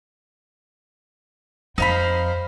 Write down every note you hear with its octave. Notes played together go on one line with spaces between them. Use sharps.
F2 D#4 C5 F5 B5